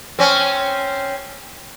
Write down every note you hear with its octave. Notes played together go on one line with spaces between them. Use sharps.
C4 C#4